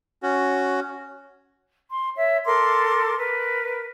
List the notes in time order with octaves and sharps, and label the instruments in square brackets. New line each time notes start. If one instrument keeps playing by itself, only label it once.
[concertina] C#4 F#4
[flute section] C6
C#5 E5
A4 A#4 C6 D6
A#4 B4